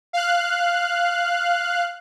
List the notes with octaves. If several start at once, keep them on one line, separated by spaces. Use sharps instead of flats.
F5 F#6